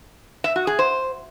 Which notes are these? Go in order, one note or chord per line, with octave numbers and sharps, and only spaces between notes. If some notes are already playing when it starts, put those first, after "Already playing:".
E5
F#4
G#4
C5